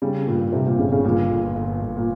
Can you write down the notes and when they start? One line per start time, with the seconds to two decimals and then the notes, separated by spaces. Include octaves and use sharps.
0.02 C#3 G3
0.27 G2 A#2
0.53 C3 G3
0.66 A#2
0.78 G1 C#3
0.92 C#3
1.04 G2 A#2
1.31 G1
1.55 G1
1.82 G1
1.97 A#2